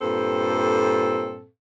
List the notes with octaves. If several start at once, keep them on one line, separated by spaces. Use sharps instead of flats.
G2 A#2 C4 A4